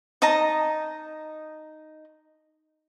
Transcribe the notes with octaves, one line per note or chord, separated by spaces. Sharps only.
D#4 D#5 A5 A#5